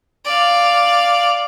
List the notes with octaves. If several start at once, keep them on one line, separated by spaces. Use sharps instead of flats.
D5 F5